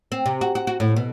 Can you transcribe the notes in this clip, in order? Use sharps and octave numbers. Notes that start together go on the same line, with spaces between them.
C4
C3
F#4
F#4
F#4
A2
B2